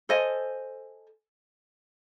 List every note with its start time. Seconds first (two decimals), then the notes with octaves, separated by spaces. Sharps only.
0.09 A4 C5 D#5 G#5